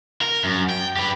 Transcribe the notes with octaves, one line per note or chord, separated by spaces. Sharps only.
A#4
F#2
G5
G4 B4